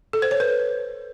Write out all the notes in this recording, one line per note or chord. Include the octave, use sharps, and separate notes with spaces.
A4
C5
C#5
B4